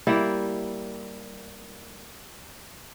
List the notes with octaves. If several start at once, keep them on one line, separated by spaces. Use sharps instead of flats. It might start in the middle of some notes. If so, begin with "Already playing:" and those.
G3 A#3 E4